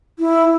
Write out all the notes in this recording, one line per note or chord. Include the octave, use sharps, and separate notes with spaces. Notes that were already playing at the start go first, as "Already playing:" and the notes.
E4